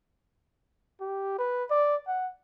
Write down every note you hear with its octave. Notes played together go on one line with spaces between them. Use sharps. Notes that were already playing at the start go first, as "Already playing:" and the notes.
G4
B4
D5
F#5